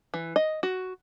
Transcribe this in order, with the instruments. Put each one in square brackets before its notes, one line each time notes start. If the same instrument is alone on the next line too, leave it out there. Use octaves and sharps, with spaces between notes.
[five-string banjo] E3
D#5
F#4